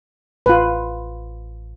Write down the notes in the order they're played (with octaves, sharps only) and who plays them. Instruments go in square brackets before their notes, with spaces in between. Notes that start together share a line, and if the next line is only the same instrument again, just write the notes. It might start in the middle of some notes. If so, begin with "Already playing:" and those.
[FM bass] A1 [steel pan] F4 B4